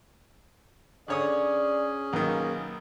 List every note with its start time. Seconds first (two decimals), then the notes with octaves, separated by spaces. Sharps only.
1.08 D3 C#4 G#4 C#5 D5 D#6
2.13 B1 D#3 A#3